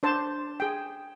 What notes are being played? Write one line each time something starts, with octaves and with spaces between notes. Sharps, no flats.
D4 C5 A5
G#4 G5